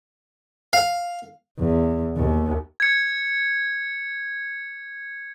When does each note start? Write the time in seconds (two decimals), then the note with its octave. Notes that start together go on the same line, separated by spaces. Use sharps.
0.73 F5
1.59 E2
2.16 D#2
2.80 G#6 C#7